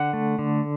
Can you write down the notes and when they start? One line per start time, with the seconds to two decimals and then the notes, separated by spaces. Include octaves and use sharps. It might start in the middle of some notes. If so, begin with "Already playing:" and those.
Already playing: D3 F#5
0.13 A3
0.39 D3